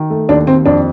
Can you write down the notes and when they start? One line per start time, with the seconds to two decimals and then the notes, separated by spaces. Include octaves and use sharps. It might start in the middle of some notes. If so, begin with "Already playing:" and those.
Already playing: D#3
0.10 A3
0.29 D#2 D4
0.47 D#2 C4
0.66 F2 D4